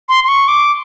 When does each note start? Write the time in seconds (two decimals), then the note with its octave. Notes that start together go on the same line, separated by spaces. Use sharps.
0.09 C6
0.24 C6
0.28 C#6
0.48 D6